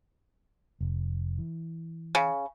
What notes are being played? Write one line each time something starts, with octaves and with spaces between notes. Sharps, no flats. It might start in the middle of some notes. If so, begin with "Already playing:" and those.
F1
E3
C#3